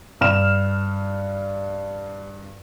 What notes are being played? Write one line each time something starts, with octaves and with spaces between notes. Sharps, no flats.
G2 F6 E7